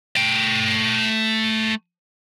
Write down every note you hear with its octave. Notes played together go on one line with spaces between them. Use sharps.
A3 G5